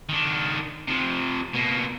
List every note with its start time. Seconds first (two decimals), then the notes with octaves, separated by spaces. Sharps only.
0.09 D#3 D4
0.88 C3 F3
1.54 B2 A#3